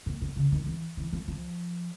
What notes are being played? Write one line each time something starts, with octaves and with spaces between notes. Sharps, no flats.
A#2
B2
C#3
D#3
E3
E3
F3
F3